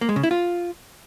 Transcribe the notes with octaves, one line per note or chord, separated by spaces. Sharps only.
A#3
G#3
C#3
E4
F4